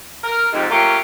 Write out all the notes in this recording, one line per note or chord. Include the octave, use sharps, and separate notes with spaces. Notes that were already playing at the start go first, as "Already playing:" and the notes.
A#4
F2 G#2 C3
F#3 A3 A#3 C#4 F4 G4